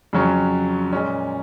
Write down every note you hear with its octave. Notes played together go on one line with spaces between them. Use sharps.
F2 C#3 F#3 C#4
A#2 G#3 C#4